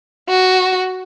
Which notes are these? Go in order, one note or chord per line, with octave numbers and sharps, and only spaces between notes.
F#4